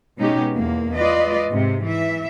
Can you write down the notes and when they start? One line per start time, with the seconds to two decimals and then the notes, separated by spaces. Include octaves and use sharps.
0.18 B2 G#3 B3 C#4 D#4 G4
0.51 E2 A#3
0.94 G#3 F4 B4 D5 D#5
1.49 G#2 C3
1.84 E3 E5